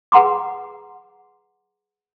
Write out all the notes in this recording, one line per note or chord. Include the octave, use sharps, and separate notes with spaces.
G#4 B4 F#5 A#5 C6 D6